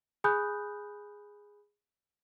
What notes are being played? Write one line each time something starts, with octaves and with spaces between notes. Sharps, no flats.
G#4 G#5 B5 D#6 F#6 G6